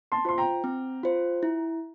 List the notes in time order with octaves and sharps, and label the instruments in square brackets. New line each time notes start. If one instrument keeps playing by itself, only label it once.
[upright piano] A5 C6
[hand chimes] F4 C5 [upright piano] C6
[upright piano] G5 A#5
[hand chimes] C4
F4 C5
E4